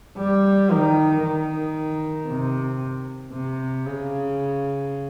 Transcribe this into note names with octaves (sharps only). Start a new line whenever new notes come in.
G3
D#3
D#3
C3
C3
C#3